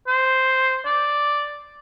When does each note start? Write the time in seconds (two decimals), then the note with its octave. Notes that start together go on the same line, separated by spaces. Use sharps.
0.07 C5
0.86 D5